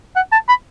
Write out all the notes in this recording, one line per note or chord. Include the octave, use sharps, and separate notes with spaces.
F#5
A5
B5